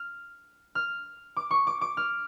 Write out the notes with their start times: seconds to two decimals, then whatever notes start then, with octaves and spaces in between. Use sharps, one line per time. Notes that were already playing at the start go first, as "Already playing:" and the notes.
Already playing: F6
0.75 F6
1.36 D6
1.51 C#6
1.67 D6
1.81 D6
1.97 F6